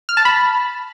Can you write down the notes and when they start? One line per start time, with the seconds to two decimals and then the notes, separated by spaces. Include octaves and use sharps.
0.09 F6
0.17 A5
0.25 B5